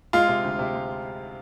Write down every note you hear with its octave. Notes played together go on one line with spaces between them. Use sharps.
G#3 F4 F5
C3
D2
C3
G#3